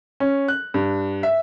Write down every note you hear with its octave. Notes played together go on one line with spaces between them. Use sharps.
C#4
F#6
G2
E5